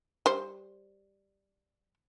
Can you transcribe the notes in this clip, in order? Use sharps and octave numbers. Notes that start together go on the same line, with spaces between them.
G3 C5